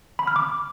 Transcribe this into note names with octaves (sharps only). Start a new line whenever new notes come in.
B5
F6
D6